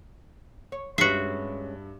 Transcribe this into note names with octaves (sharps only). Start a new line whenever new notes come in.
C#5
G2 G#3 C#4 F#4 B4 E5 C7 C#7